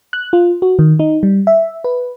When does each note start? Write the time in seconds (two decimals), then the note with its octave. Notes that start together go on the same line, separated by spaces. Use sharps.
0.13 F#6
0.33 F4
0.62 F#4
0.79 D#3
0.99 D#4
1.23 G3
1.47 E5
1.84 B4